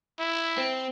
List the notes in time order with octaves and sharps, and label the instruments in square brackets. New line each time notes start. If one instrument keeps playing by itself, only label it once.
[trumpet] E4
[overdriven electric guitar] C4